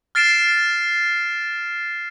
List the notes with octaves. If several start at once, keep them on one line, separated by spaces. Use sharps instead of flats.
F6 A6 C7 D7 E7